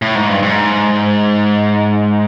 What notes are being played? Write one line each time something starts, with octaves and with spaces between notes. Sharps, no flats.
A2
G#2
G2
G#2